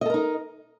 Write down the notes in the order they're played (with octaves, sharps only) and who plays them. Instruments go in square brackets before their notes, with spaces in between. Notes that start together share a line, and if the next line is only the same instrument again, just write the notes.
[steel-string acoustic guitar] D#5
A4
A#4
D#4